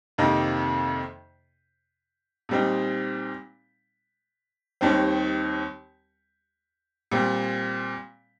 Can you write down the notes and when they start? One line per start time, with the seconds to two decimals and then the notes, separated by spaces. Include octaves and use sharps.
0.18 F2 C3 D#3 A#3 D#4
2.49 A#2 G3 C4 D#4
4.81 D#2 D#3 G3 C4
7.11 A#2 G3 C4